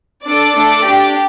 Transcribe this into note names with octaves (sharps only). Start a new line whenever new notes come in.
D4 A4 D5 D6
A3 D4 A4
D4 G4